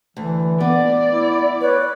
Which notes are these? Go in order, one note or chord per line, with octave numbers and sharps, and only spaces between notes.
D2 E3
B3 D5
E4
B4 C#5